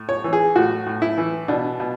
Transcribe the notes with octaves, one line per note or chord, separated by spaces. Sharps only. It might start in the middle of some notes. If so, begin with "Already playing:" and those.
Already playing: A2
C#5
E3
G#4
A2 F#4
A2
E4
E3
B2 D4
B2